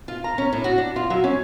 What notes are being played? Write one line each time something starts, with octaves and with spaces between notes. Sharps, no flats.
F4
A#5
C#4
A2
F#4
D4
F4
F#3
C#4